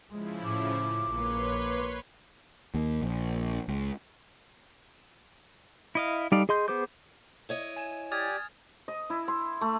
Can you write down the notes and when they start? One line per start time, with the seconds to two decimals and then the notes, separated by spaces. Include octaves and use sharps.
0.10 C#3 F3 G#3 E4
0.44 A2 D6
1.09 A#1 A#3 B4 C#5 C6
2.74 D#2
3.02 A#1
3.68 C#2
5.95 E4 D#5 F5
6.32 G3 D#4 A4 D5 F5
6.49 G#4 D#5 C6 G6
6.68 B3 G#4 C5 D6 G6
7.49 E4 C#5 D#5
7.76 G#5 G#6 E7
8.12 G4 D5 G#5 D#6 F6 G#6 A6
8.88 D#5
9.10 E4
9.28 C6
9.61 A3